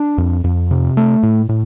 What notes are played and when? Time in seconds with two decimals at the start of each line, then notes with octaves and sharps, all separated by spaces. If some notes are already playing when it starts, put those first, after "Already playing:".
Already playing: D4
0.18 F2
0.44 F2
0.71 C3
0.97 A3
1.23 A2
1.49 A2